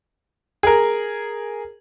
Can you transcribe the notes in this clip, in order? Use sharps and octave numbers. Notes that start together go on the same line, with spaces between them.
G#4 A#4